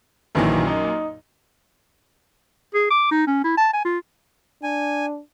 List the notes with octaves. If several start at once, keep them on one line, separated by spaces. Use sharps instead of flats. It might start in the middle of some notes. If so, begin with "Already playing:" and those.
A#1 F#2 A#2 D#3 E3 F#3
D#4
G#4
D6
D#4
C#4
E4
A5
G#5
F4
D4 G#5